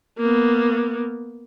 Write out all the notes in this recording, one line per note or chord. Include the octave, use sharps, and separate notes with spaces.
A#3 B3